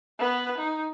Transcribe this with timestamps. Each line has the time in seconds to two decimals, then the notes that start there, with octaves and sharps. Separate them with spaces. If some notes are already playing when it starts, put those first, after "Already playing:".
0.19 B3 B4
0.58 D#4